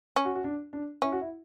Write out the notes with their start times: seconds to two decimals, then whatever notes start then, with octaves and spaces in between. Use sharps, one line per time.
0.16 C#4
0.25 F#4
0.35 F#4
0.44 D4
0.73 D4
1.02 C#4 E4
1.12 F#4
1.21 E4